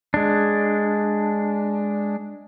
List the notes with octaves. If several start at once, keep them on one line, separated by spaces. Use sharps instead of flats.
G#3 D4